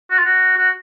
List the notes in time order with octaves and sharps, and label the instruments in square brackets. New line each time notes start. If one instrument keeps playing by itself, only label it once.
[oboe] F#4
F4
F#4
F#4